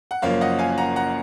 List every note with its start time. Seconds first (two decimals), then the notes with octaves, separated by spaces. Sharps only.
0.11 F#5
0.22 F#1 F#2 F3 A#3 C#5 F5
0.41 D#5 F#5
0.59 F5 G#5
0.78 F#5 A#5
0.96 F#5 A#5